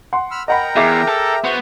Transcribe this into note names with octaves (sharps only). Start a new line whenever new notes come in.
F#5 C6
B5 E6 F6
A#4 D#5 F#5 G5 A#5 B5
E2 G#4 E5 D6
A4
B3 F#4 C5 C6